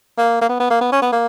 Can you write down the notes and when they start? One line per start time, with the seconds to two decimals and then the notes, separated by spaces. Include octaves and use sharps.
0.18 A#3
0.41 A#3
0.49 B3
0.60 B3
0.70 A#3
0.81 B3
0.92 C#4
1.02 B3
1.12 A#3